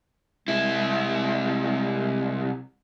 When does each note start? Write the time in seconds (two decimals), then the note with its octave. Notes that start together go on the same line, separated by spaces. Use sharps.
0.48 C2 G#3 E4